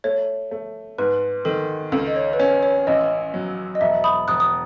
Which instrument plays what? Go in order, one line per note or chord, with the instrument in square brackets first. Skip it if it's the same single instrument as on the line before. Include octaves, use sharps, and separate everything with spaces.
[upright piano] A3 [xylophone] C#5
[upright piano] A3
[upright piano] G#2 [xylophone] B4
[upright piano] D#3 [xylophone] A4
[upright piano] C#2 [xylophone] A4
[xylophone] D#5
C#5
B4
[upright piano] C#4 [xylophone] C#5
[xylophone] C#5
[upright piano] A1 [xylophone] D#5
[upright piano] F#3
[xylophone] D#5
[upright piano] E1 [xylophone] E5
[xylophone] B5 D#6
[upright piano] E1 [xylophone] D#6 F#6
[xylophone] D#6